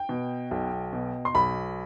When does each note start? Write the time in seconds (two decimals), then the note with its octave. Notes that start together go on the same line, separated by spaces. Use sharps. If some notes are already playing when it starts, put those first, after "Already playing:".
Already playing: G5
0.09 B2
0.51 B1
0.93 B2
1.25 C6
1.34 B1 B5